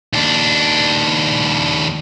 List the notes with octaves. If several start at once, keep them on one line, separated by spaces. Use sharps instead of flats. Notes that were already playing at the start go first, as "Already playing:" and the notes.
D#2 D4